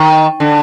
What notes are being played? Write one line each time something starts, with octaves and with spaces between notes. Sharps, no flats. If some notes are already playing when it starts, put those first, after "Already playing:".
Already playing: D#3
D3